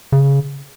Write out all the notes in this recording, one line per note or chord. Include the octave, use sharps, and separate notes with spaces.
C#3